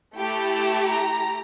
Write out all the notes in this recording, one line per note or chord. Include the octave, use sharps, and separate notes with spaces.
A3 E4 G4 G5
A5
A#5